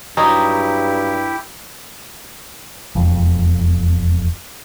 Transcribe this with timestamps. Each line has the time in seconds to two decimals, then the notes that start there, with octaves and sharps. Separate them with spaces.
0.17 G2 F#3 D#4 E4 G4
2.95 E1 F2